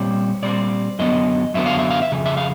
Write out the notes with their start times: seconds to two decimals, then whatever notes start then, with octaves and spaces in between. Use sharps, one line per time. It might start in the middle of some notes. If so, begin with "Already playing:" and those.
Already playing: A#2 G3 C4 C#5
0.42 A#2 G3 C4 D5
0.99 F#2 D3 F#3 B3 D#5
1.54 F#2 D3 F#3 B3 E5
1.66 F5
1.79 E5
1.91 F5
2.02 E5
2.12 F2 C#3
2.26 E5
2.37 F5